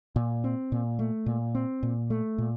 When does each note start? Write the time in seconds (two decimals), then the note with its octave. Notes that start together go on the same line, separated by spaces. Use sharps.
0.16 A#2
0.44 C4
0.72 A#2
0.99 A3
1.26 A#2
1.55 C4
1.83 A#2
2.10 A3
2.38 A#2